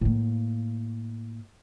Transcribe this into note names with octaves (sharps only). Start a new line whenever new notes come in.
A2 A#3